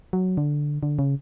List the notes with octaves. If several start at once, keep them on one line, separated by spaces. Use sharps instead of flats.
F#3
D3
D3
C#3